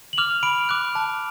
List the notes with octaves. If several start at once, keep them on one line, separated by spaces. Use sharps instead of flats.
F#7
D6 F6 F7
B5 D7
D6 F#6
A5